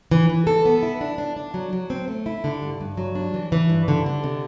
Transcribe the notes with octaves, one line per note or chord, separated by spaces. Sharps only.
E3
E3
A4
B3
E4
D4
D4
D4
F#3
F#3
C4
A3
E4
D3
G2
G2
F#3
D4
E3
E3
G2
D3
D3
C3